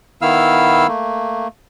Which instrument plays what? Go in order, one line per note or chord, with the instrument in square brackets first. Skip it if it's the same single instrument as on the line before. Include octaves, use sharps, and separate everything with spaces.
[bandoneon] D#3 B3 E4 F5 E6 F6
A3 A#3